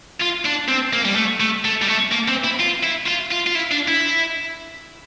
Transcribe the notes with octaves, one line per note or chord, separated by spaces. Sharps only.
F4
D4
C4
A#3
G3
A3
A3
A3
G3
A3
A#3
C4
E4
F4
E4
F4
F4
F4
E4
D4
E4